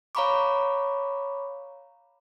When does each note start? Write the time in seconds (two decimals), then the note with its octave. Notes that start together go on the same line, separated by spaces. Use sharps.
0.15 C#5 F5 A#5 B5 C#6 D6